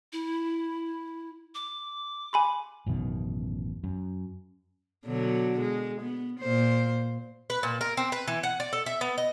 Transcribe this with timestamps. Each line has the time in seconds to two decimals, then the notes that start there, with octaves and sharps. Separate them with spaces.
0.13 E4
1.55 D6
2.33 G#5 B5 C6
2.86 A1 F#2 B2 D#3
3.84 F#2
5.05 B2 D3 F#3
5.61 G#3
6.02 B3
6.40 A#2 C5
7.50 B4
7.63 A#2
7.81 A#4
7.97 C4
8.12 B4
8.28 E3
8.43 F#5
8.60 D5
8.73 A4
8.86 E5
9.01 B3
9.18 D#5